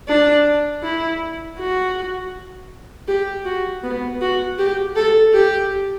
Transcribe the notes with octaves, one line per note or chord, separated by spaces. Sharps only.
D4
E4
F#4
G4
F#4
B3
F#4
G4
A4
G4